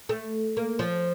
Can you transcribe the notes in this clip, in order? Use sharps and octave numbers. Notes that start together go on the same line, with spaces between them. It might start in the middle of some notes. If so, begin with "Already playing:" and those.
A3
A#3
F3